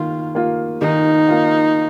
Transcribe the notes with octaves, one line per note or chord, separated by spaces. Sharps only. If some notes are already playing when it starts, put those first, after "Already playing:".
Already playing: D#3 A#3 F4
A#3 F4
D#3 D#4
A#3 F4